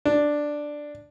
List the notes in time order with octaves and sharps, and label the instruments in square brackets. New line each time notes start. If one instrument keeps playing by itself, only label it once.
[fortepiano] D4